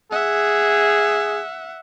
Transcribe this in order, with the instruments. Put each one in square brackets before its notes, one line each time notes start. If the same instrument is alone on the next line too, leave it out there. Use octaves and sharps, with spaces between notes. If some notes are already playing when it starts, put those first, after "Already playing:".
[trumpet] G#4 [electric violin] E5 F#5